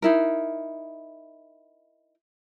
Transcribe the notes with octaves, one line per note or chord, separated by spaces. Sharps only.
D#4 E4 A#4